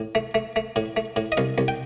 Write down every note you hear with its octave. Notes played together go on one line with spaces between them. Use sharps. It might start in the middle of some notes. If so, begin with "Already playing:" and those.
Already playing: A2
A3
A3
A3
A2
A3
A2
D#5
C2 F5
C2
G5